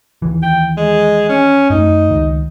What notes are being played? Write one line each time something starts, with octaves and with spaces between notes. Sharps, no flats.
D#2 E3
G5
G#3
C#4
F#2 A3 D#4
C#2 D#3